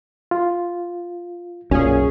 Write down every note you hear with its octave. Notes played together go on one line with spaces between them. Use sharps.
F4
B1 F#2 A#2 C#4 G#4